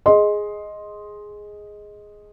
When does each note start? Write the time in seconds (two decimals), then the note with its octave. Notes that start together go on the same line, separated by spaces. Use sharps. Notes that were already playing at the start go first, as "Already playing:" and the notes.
0.06 G#4 D#5 C6